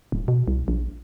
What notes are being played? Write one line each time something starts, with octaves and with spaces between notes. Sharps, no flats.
D1
B2
C2
A#1